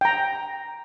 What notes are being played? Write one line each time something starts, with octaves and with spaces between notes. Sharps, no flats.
G5 A#5